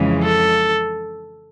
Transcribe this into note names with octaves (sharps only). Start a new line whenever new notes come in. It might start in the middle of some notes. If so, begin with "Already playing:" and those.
Already playing: F2 C#3 E3 G#3
A4